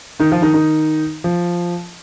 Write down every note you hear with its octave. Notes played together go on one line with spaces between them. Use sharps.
D#3 D#4
F3 F4
D#3 D#4
D#3 D#4
F3